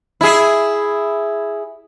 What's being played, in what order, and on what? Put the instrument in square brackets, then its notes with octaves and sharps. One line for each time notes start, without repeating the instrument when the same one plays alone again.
[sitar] E4 G#4